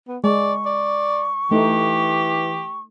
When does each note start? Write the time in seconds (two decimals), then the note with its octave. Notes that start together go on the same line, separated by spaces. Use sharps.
0.08 B3
0.24 G#3 D5 C#6
0.66 D5
1.51 E3 A3 D#4 G4